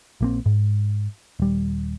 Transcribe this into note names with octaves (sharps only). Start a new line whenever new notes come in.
A#1 A#3 C4
G#2
D#1 G3